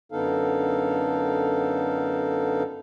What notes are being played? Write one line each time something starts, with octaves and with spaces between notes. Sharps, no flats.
F#2 D3 B3 D#4 A4 F5